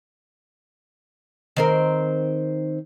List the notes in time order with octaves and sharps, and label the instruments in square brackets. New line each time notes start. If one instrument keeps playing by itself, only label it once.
[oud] D#3 C4 A#4